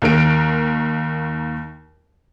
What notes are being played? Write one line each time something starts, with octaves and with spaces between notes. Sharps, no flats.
D#2 D#3 A#4 D7